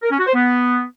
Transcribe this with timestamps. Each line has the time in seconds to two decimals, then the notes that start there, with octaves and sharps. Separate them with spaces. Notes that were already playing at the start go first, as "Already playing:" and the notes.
0.03 A#4
0.11 C#4
0.19 F#4
0.26 C5
0.34 B3